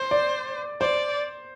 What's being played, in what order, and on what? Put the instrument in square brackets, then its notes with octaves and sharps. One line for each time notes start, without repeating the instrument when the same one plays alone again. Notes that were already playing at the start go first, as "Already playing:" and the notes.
Already playing: [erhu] C5
[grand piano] D5
[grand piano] C5 [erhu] D5